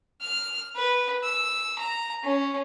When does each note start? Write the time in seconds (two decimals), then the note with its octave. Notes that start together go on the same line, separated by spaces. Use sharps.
0.21 F6
0.75 B4
1.23 E6
1.78 A#5
2.23 C#4